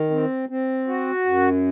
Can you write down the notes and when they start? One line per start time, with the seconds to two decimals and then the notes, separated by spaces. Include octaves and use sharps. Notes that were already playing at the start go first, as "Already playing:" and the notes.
Already playing: D#3
0.10 C4
0.49 C4
0.87 F#4
1.26 F#2